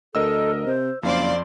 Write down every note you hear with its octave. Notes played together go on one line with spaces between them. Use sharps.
D2 A4 A#4 D#5 E6
C3 C5
F#1 F2 C5 D5 F5 C6